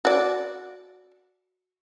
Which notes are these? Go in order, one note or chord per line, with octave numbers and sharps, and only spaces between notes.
F#4 D5